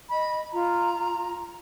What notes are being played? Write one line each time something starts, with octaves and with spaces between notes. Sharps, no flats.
D#5 B5
F4 A#5